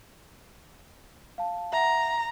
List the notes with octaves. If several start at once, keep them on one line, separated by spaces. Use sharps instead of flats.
F5 A5
E5 F#5 A#5